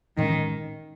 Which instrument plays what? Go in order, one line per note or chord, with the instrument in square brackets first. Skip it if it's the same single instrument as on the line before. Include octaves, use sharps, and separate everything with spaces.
[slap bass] A1 A2 G#3 C#4 [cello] D#3